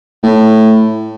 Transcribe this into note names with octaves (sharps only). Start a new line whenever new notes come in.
A2